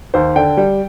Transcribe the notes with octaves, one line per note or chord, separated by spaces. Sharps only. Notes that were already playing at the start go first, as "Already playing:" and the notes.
D#2 C5
D3 G5
G3